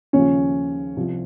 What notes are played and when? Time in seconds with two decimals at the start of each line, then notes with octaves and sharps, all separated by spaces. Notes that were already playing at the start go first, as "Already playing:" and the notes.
0.13 D#2 C#3 F3 C#4
0.96 C2 C3 F3